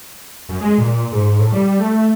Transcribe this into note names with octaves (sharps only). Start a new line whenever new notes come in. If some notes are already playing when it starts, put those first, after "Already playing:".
F#2
G#3
A#2
G#2
A2
G3
A3